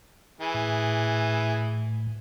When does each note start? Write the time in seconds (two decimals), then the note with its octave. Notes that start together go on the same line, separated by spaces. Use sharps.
0.40 E3 G#4
0.54 A2